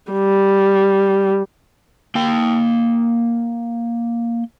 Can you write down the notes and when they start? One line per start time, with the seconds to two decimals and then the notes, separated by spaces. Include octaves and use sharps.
0.12 G3
2.15 A#3 G5